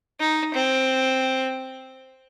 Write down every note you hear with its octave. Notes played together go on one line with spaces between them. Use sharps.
D#4
C4